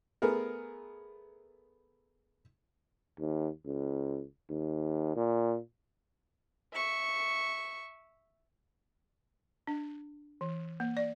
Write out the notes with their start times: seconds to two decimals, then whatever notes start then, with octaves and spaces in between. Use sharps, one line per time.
0.22 A3 B3 G#4 A#4
3.20 D#2
3.65 C#2
4.50 D#2
5.16 A#2
6.74 E5 C#6
9.67 D4
10.41 E3
10.80 A#3
10.97 D5